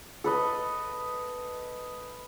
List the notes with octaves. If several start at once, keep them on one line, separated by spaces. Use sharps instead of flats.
A4 B4 D#5